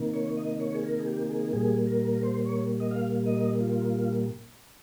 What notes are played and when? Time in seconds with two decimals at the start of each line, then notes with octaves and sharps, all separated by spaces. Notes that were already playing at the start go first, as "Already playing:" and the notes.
Already playing: C3 D#3 A#3
0.14 C#5
0.37 D#5
0.60 C#5
0.74 G#4
0.83 A#4
0.99 G#4
1.07 G4
1.29 G#4
1.53 A#2 G3 A#3 G#4
1.87 A#4
2.13 A#4
2.23 C5
2.45 C#5
2.80 D#5
2.91 F5
3.26 D#5
3.61 F4